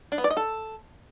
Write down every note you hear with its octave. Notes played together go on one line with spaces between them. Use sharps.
D4
B3
D5
D#5
A4